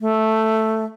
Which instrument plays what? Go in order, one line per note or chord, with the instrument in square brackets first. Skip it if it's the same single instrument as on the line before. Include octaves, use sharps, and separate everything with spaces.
[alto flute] A3